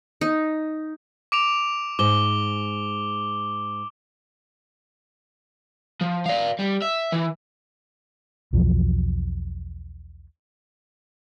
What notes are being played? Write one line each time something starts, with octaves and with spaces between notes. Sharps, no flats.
D#4
D6 D7 F7
G#2 D6 G7
F3
D5 F5
G3
E5
E3
B1 E2 F3 F#3